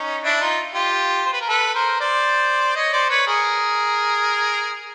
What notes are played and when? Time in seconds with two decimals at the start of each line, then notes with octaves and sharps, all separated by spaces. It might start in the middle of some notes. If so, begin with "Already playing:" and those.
Already playing: C#4 D#4
0.24 D4 E4
0.41 D#4 F4
0.74 F4 G4
1.26 C5
1.33 B4
1.41 A#4
1.48 A4 B4
1.75 A#4 C5
2.00 C5 D5
2.76 C#5 D#5
2.93 C5 D5
3.10 B4 C#5
3.27 G#4 A#4